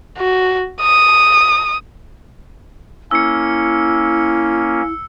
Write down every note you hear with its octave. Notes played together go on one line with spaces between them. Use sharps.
F#4
D#6
A#3 C#4 E4 E6 C#7